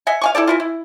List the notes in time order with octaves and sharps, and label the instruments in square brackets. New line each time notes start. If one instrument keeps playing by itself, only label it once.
[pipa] D#5 E5 F#5 G#5
F5 G#5 C#6
E4 G#4 A4 D5
E3 E4 F4
E4